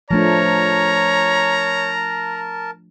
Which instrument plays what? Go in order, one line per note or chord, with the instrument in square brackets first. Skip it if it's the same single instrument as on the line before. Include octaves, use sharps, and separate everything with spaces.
[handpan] F3 A3 D4 [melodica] A#4 A5 [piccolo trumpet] C#5 [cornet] A#5